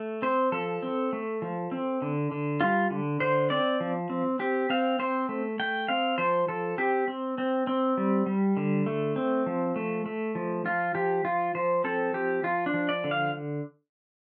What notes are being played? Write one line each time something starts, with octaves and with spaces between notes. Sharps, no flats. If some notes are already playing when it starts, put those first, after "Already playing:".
Already playing: A3
C4 C5
F3 A4
C4
A3
F3
C4
D3
D3
G3 F4
D3
D3 C5
C4 D5
F3
C4
C4 G4
C4 F5
C4 C5
A3
A3 G5
C4 F5
F3 C5
F3 A4
C4 G4
C4
C4
C4
G3
G3
D3
A3
C4
F3
A3
A3
F3
F3 F4
F3 G4
F3 F4
F3 C5
C4 A4
F3 G4
F3 F4
D4
F3
D5
D3
F5